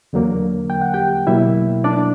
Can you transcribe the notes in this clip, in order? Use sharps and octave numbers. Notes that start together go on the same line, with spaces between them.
E2 D3 F#3 A#3
G5
F#5
G4 G5
B2 F#3 A#3 E4 E5
D4 D5